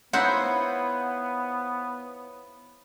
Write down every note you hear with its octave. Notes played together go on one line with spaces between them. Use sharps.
B3 D#4 E4 C5 C#5 F5 F#5 B5